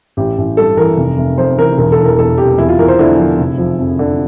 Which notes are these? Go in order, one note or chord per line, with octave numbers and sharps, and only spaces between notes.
A1 G4
A1
G2 A4
E3 A#4
F1
F1
F2 C5
E3 A#4
E1 A#4
A4
E3
A#4
E2 A4
C3 G4
E2 E4
F4
E2 A#4
C5
D3 E4
F3
F1
F3
F2
D3